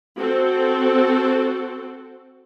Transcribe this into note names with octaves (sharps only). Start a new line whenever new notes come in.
C4 F#4 A4